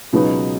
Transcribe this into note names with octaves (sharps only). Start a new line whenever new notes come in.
C#2 B2 F#3 B3 D#4